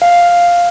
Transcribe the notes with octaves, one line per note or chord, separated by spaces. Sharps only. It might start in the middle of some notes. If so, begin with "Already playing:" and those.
F5